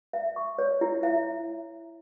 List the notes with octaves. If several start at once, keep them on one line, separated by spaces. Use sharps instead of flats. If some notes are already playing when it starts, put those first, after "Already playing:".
E5
C#6
C#5
E4
E5